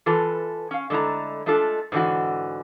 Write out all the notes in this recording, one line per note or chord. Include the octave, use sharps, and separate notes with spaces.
E3 F4 A4 B4
C#4 F5
D3 G#3 A3 E4 A#5
G#3 A3 D4 F4 A4
G#2 D3 E3 F#4